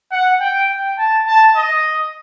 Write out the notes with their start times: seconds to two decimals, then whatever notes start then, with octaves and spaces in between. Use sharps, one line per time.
0.12 F#5
0.41 G5
0.69 G5
0.98 A5
1.27 A5
1.56 D#5